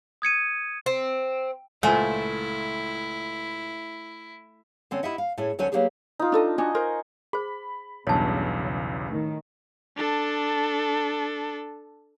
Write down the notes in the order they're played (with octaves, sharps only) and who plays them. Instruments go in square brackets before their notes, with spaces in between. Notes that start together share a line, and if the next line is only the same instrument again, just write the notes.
[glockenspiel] D#6 G#6 C#7 D#7
[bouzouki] C4
[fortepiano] C#2 A#2 C5 [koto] A3 [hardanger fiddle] E4 [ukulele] F#5 G#5 A5
[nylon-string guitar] D3 C4 C#4
E4 G4 D#5 E5 F#5
F5
A2 A3 C#4 E4 G#4
D2 F#3 C#4 A4 C5 G#5
F#3 G#3 A#3 B3 G4 G#4
[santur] D#4 F4
[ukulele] D4 A4 D#5
[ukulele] D4 F#4 [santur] D#5 G#5 C#6
[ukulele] A#4 C5
[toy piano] G#4 C5 [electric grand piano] B5
[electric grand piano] B1 E2 G2 [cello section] C#3 [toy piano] C#5 A5
[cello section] A2 D#3
[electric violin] D4 A4